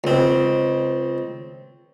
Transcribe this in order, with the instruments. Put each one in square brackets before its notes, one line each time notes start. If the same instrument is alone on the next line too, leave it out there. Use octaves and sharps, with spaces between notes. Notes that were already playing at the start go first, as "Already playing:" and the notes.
[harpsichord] C#2 C4